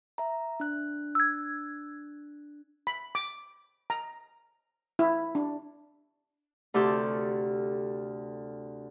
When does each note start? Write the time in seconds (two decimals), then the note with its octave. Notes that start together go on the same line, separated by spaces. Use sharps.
0.18 E5 A#5
0.60 D4 F#6
1.15 E6 G#6
2.87 B5
3.15 D6
3.90 A#5
4.99 E4
5.35 D4
6.74 D2 C3 G4 A4 C6 G6